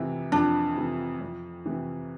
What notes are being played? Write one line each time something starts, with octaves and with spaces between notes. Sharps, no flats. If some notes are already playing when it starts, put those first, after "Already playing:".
Already playing: F2 C3 E3
F2 D4
C3 E3
F2
C3 E3